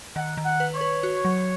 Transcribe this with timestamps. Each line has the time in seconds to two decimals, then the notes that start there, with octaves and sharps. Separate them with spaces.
0.16 D#3 F#5
0.37 D#3
0.45 F#5
0.60 B4
0.75 C#5
0.81 B4
1.03 F#4
1.25 F#3